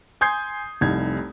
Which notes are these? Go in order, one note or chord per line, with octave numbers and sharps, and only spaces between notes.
G#5 C6 D#6 G6 G#6 C7
F1 C2 D#4 G#6